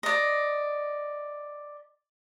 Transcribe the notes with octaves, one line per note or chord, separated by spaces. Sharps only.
D5 D#5